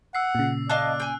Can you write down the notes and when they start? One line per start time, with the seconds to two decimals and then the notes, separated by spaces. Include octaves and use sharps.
0.15 F#5 E6 C7
0.35 A#2 C#3
0.70 D5 D#5 F5 A5 F#6
1.00 G5 G#5